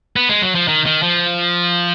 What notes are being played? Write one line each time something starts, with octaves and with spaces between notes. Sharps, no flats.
B3
G#3
F#3
F3
D#3
D#3
F3